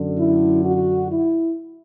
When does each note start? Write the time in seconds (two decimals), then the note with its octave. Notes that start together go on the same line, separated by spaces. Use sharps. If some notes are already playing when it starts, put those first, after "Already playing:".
Already playing: F#2 D3
0.18 E4
0.64 F#4
1.10 E4